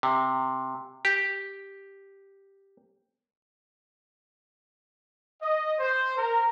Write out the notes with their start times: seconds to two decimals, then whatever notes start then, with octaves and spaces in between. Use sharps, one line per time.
0.03 C3
1.05 G4
5.43 D#5
5.80 C5
6.17 A#4